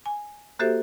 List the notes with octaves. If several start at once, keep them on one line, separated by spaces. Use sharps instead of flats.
G#5
A#3 F#4 G4 A4 C5 E5